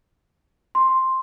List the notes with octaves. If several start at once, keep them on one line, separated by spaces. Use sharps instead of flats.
C6